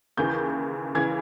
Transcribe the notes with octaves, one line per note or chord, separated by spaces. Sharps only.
D#2 C#3 E3 G6
C#3 E3 G#6